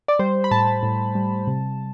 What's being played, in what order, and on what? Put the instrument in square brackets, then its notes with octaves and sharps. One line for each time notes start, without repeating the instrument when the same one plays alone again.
[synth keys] D5
G3 C5
B5
A2 A5
A2
G3
C3